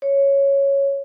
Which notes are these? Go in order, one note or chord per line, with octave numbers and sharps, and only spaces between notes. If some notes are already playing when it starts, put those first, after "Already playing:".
C#5